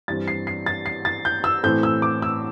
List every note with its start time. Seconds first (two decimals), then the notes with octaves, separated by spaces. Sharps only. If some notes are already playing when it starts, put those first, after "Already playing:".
0.08 G2 E3 G3 C4 A6
0.28 C7
0.47 C7
0.66 A6
0.86 C7
1.05 A6
1.25 G6
1.44 E6
1.63 A2 E3 C4 G6
1.83 E6
2.02 D6
2.22 E6